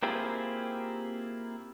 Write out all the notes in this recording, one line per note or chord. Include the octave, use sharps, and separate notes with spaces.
A#3 C4 E4 F4 G4 G#4